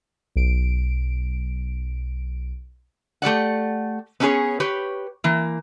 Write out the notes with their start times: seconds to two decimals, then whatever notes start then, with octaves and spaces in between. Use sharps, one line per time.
0.36 B1 D7
3.22 A3 G4 D5 F#5
4.20 B3 C#4 D4 E4 G#4 C#5
4.60 G4 B4 C#5
5.24 E3 A#3